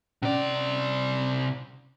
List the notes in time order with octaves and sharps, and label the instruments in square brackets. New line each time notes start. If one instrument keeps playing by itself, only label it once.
[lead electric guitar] C3 D5 [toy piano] C#4